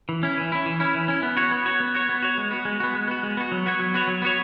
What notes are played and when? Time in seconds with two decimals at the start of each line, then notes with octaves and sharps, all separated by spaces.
0.09 E3
0.23 C#4 E4
0.38 E3
0.52 C#4 E4
0.66 E3
0.80 C#4 E4
0.94 E3
1.08 C#4 E4
1.23 B3
1.37 F#4 C#5
1.51 B3
1.66 F#4 C#5
1.80 B3
1.95 F#4 C#5
2.09 B3
2.23 F#4 C#5
2.38 G#3
2.51 B3 F#4
2.65 G#3
2.80 B3 F#4
2.94 G#3
3.08 B3 F#4
3.23 G#3
3.37 B3 F#4
3.52 F#3
3.66 B3 F#4 C#5
3.79 F#3
3.94 B3 F#4 C#5
4.08 F#3
4.22 B3 F#4 C#5